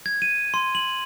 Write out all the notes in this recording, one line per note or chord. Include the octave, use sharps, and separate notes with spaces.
G#6
D#7
C6
F#7